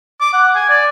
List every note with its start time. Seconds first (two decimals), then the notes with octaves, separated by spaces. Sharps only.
0.21 D6
0.33 F#5
0.55 G#5
0.69 D5